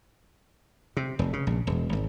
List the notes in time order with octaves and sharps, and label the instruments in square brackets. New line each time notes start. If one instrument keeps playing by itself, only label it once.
[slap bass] C3
F1
C#3
A#1
E1
G#1